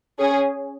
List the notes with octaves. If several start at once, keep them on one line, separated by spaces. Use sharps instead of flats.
C#4 G#4